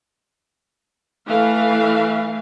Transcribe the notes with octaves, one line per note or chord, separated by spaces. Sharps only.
E3 A3 F5